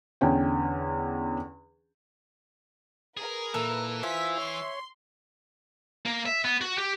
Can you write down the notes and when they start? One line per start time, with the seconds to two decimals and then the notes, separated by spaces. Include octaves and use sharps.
0.21 E2 D3 C#4 G5
3.17 G#4 A#4 B4
3.54 A#2 E3 A4
4.03 F4 C5 E5 G#5 B6
4.38 C#5 C6
6.05 A#3
6.26 E5
6.45 B3
6.61 F#4
6.78 G4